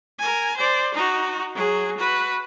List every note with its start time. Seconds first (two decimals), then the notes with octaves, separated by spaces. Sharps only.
0.19 A#4 G#5
0.56 C5 D5
0.94 D#4 F#4
1.55 F#3 G#4
1.98 F#4 B4